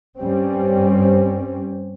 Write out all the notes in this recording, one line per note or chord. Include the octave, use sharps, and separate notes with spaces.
G2 G3 C4 C#4